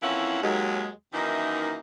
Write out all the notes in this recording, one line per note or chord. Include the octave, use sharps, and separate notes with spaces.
F2 E3 A#3 C#4 E4 F#5
D#2 F#3 G#3
F#2 D#3 E3 A#3 D#4 E4